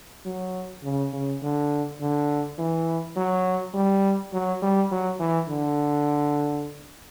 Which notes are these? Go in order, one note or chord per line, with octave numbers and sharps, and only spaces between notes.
F#3
C#3
C#3
D3
D3
E3
F#3
G3
F#3
G3
F#3
E3
D3